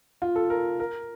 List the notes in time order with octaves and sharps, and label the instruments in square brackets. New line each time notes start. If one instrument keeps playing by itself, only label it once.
[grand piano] F4
A4
A#4
A#4